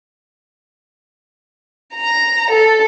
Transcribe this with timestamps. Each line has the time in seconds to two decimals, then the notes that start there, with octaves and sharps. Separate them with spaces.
1.95 A#5
2.50 A4